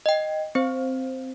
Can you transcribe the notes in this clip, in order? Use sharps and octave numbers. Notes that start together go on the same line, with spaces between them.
D#5 G5
C4 C5